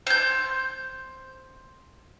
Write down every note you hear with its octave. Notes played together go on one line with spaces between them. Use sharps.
C5 G6